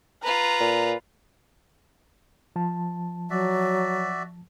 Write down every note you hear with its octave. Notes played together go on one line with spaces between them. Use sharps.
F4 B4 A#5
A#2
F3 A5
F#3 F#4 D5 E5